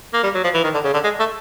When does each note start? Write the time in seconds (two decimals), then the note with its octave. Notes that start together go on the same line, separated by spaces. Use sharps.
0.13 A#3
0.23 G3
0.34 F#3
0.44 F3
0.54 E3
0.64 D#3
0.74 D3
0.84 C#3
0.94 D3
1.04 G#3
1.19 A3